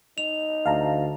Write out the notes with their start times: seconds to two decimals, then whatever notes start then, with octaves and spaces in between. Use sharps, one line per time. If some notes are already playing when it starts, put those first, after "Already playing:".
0.18 D#4 F7
0.66 D2 F5 A5 A#5